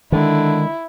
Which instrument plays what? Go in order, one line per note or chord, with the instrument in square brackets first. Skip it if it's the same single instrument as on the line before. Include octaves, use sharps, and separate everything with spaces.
[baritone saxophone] D3 [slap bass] D#3 G#3 [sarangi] E4